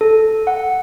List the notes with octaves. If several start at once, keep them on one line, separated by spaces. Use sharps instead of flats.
A4
F#5